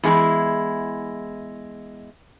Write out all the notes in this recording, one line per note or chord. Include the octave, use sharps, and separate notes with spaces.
E2 G#3 E4